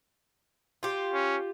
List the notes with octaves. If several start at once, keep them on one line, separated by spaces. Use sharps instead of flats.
F4 G4
C#4